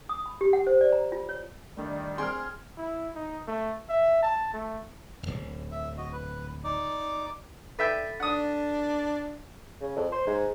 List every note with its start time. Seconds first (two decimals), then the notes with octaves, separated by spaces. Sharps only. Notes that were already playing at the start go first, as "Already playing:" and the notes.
0.09 D#6
0.26 B5
0.41 G4
0.53 F#5
0.67 C5
0.81 D5
0.92 A#5
1.12 F4
1.29 C#5
1.77 D#3 G3 A3 D4
2.18 C4 G#4 G5 C6 F6
2.77 E4
3.15 D#4
3.47 A3
3.89 E5
4.22 A5
4.54 A3
5.23 D1 G1
5.72 E5
5.97 F#4 D#5
6.13 B4
6.64 D#4 D5 D6
7.79 A4 B4 E5 G5 A6 B6
8.20 D4 F#5 D#6
9.81 C#3
9.97 F2
10.12 C5
10.27 G#2